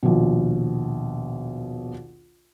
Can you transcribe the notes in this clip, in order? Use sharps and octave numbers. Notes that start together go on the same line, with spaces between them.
A#1 D#2 B2